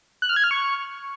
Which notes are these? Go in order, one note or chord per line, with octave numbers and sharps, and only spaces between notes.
F#6
F6
G#6
F6
C#6